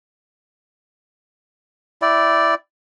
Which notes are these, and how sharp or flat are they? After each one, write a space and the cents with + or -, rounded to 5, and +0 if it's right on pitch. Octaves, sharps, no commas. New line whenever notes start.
E4 +5 D5 +0 G5 -25